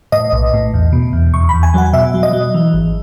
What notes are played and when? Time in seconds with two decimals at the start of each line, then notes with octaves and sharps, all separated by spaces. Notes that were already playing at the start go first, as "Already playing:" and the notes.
0.12 A2 D#5
0.32 B1
0.54 A2
0.74 E2
0.93 B2
1.13 E2
1.34 E2 C#6
1.49 B5
1.54 E2
1.63 G#5
1.74 F#3 F#5
1.93 B2 E5
2.14 F#3
2.23 D#5
2.33 F#3
2.54 E3
2.73 G#1